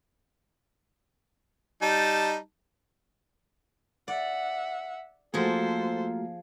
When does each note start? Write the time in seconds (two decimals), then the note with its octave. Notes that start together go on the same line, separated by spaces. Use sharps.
1.82 G3 D#4 A5
4.08 D5 E5 F#5
5.34 F3 A3 A#3 F4 F#4 G#4 A4 C5